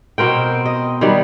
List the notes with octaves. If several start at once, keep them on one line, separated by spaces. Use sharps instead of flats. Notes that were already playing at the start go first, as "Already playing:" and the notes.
B2 C4 A#4 G5
D#5
D#3 F#3 G3 B3